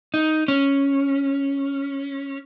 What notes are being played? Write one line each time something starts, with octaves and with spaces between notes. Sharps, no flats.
D#4
C#4